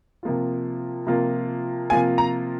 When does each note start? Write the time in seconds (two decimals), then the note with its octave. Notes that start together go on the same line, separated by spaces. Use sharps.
0.23 C3 F3 A#3 F4
1.07 C3 F3 A#3 F4
1.90 C3 F3 A#3 F4 G#5
2.18 A#5